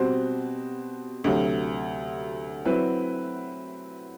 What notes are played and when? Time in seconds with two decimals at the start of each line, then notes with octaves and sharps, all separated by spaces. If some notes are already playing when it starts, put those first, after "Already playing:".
Already playing: B2 G3 C4 F#4 C5
1.24 D2 C3 F#3
2.65 F#3 C4 E4 B4